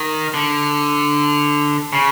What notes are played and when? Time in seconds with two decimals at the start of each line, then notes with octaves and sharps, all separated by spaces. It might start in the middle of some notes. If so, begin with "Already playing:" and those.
Already playing: D#3
0.34 D3
1.93 C#3